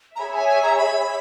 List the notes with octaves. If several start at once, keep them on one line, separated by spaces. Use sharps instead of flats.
A#5
G#4 C#5 E5 B5
G#5
G#5
A#5
B5